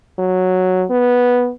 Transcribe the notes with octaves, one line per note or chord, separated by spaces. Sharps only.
F#3
B3